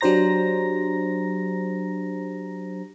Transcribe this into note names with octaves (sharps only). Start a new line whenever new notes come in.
F#3 D4 G4 C5 A#5 A#6